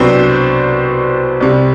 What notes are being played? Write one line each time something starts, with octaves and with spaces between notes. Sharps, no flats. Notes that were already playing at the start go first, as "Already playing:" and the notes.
Already playing: C2 B2 F#3 B3 C4 D4 C5
C2 C3 G3